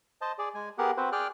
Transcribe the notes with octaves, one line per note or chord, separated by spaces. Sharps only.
C5 D#5 A5
G#4 D5
G#3 G#5
B3 G4 G#4 A#4 F#5
C4 F#4 B4 C5
G#4 D5 G5 F6 F#6